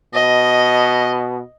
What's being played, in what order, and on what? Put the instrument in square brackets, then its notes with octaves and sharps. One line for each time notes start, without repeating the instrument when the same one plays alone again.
[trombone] B2 [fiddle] D#5